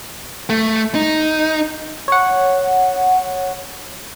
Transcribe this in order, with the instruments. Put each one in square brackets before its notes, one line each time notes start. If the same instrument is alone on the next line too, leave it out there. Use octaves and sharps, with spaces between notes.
[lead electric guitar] A3
D#4
[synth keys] C#5 F#5